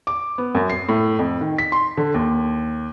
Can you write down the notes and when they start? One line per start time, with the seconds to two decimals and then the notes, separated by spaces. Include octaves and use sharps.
0.07 D6
0.38 B3
0.55 F#2
0.70 C7
0.89 A2
1.19 F2
1.41 D#3
1.58 B6
1.72 C6
1.97 D3
2.14 D#2